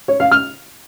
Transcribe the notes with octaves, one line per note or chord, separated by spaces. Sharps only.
C#5
F5
F6